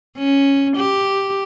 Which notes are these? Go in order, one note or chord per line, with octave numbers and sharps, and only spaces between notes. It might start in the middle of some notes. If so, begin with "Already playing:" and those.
C#4
G4